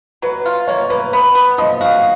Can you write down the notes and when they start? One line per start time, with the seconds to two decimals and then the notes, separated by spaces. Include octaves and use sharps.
0.22 F#3 B4
0.46 F4
0.67 A#3 C#5
0.90 A#3 B4
1.13 B3 B4
1.35 B3
1.58 F3 D#5
1.81 F#4 F5